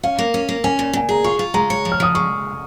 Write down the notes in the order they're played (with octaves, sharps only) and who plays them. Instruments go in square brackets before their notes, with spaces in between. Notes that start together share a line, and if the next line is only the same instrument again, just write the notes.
[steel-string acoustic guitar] C#4 [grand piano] F5
[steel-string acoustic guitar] A#3
C#4
A#3
[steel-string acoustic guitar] C#4 [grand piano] G#5
[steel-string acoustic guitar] A#2
[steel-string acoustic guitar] A#2 [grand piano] G#5
[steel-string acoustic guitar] G#4 [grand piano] A#5
[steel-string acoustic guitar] F4 [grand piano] C#6
[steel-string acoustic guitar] F4
[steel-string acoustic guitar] G#3 [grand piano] A#5
[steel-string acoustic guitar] C#5
F3
[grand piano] F6
[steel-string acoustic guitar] F3 [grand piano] D#6
[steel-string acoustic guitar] G#3 [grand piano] C#6